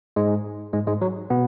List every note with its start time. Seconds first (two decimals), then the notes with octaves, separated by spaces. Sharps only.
0.16 G#2 G#3
0.73 G#2 G#3
0.87 G#2 G#3
1.01 F#3
1.30 B2 B3